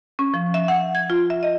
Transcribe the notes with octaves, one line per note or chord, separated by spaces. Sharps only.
C#4
F3
E5
F#5
G#6
F4
E5
D#5